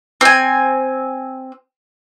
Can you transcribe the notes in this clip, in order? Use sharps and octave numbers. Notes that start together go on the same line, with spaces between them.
C4 G#5